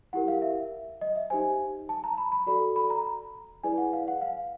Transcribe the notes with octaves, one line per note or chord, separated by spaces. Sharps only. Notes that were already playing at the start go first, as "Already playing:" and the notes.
E4 G4 A#4 F#5
F5
E5
D#5
E5
D#4 G4 C5 G#5
A5
A#5
B5
B5
F#4 A4 D5 B5
B5
A#5
E4 G#4 B4 D5 G#5
F#5
F5
F#5
F5